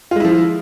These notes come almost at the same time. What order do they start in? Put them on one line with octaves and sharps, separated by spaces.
F4 G#3 E4 F3